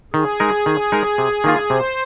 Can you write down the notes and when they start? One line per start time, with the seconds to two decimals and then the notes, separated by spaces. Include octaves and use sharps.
0.14 D#3 G#4
0.40 G#3 D#4 A#4
0.66 D#3
0.92 G#3 D#4 A#4
1.18 C3
1.44 D#3 A#3 F4
1.70 C3 C5